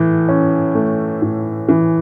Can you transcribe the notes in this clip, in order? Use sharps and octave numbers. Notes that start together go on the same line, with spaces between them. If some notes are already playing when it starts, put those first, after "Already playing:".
Already playing: A2 E3
C#4
A3
A2
E3